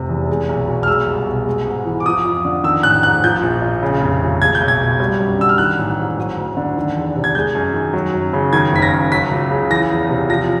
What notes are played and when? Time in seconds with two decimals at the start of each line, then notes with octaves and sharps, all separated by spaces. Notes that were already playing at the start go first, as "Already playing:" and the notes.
Already playing: F1 C3
0.09 E2
0.29 G#3
0.49 B1
0.68 B2
0.83 F6
0.88 G#3 E6
1.07 C2
1.27 B2
1.46 G#3
1.67 G#2
1.85 E3
2.00 D6
2.06 F3 D#6
2.25 F2
2.45 D3
2.64 D#3 E6
2.83 A1 F#6
3.03 G#2 F#6
3.24 F3 G6
3.43 A#1
3.62 A#2
3.83 C#3
4.02 F1
4.21 D#2
4.41 G#3 G#6
4.55 G6
4.61 B1
4.68 G#6
4.80 B2
5.00 G3
5.19 F#2
5.39 D3 E6
5.49 F6
5.58 D#3 F#6
5.79 A1
5.98 G#2
6.17 F#3
6.37 D2
6.57 D3
6.77 D#3
6.96 E2
7.15 C3
7.24 G#6
7.35 G#3 G6
7.55 F#2
7.74 D#3
7.94 F#3
8.14 F#2
8.33 C#3
8.53 D#3 G#6
8.72 F#1 B6
8.82 A#6
8.92 F#2
9.12 F#3 B6
9.31 C#2
9.51 C#3
9.70 E3 A#6
9.91 E2
10.10 C3
10.29 F3 A#6